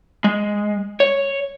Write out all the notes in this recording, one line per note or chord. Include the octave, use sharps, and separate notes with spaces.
G#3
C#5